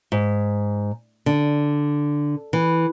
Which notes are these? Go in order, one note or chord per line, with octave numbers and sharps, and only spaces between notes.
G#2
D3
E3